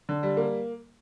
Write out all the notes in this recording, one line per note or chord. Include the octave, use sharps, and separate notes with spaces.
D3
G3
A#3